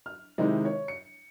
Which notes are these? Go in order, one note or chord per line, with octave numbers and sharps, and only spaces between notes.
F6
C3 D#3 G#3 D#4 E4
C#5
C#7